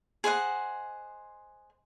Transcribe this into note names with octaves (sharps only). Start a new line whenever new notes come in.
G#4 C5 D#5 F#5